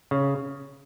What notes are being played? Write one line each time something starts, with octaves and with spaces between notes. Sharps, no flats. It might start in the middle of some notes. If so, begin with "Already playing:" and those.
C#3